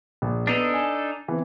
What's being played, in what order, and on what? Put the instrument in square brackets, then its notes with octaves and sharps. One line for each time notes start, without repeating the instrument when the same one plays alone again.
[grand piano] A#1
[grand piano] B3 [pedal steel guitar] D4 D#4 A4
[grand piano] G#5
E3 B3 C4